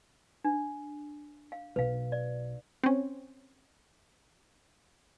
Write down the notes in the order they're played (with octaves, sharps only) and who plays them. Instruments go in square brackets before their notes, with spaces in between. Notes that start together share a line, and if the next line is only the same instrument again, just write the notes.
[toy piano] D4
F5
[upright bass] B1 [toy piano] B4 F5
[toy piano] D5
[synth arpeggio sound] C4 C#4